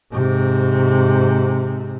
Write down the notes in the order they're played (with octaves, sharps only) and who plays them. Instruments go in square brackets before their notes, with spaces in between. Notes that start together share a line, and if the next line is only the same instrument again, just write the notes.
[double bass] G#2 C3